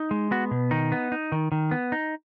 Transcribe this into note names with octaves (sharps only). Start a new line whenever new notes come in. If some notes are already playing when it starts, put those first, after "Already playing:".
Already playing: D#4
G#3
B3 F#4
B2
D#3 D#4
B3
D#4
D#3
D#3
B3
D#4